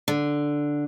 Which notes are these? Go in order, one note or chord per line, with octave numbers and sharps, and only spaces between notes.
D3